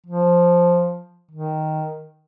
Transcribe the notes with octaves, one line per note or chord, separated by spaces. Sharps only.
F3
D#3